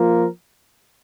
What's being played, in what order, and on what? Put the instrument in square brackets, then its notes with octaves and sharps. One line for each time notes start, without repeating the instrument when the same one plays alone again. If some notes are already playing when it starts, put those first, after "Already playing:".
Already playing: [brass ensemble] F3 A#3 F4 A#4